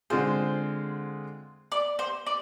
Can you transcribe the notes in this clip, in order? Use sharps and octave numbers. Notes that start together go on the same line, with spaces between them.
D3 G#3 C4 F4 G#4 C5
D5
C5
D5